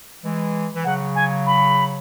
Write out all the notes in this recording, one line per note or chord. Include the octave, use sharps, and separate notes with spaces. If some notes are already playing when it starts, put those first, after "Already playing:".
E3 G#3
E3
C#3 F#3 F#5
G#5
B5